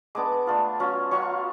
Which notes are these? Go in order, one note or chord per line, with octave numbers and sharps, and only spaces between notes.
G#3 B3 D4 D6
A3 D4 F4
F#3 C#4 F4
F#3 C#4 F4 C#6